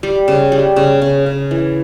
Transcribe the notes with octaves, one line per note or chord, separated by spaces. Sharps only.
G3
C#3
G3
C#3
C#3
C#3
E3